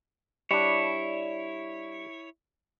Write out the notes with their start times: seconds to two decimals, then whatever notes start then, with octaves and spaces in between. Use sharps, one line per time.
0.51 G3 D4 E4 C#5